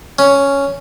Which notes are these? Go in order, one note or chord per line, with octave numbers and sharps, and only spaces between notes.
C#4